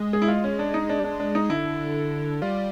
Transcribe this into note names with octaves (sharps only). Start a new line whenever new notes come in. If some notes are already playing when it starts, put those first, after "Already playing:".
Already playing: G#3
G#4
E4
F4
C#4
D4
D#4
D4
G3
G#3 D4
D4
D#4
D3 E4
G3 F4